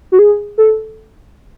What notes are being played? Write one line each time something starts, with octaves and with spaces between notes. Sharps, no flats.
F#4
G#4
A4